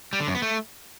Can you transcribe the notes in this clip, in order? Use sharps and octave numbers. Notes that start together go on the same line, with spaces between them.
G3
D3
F#2
B3
A3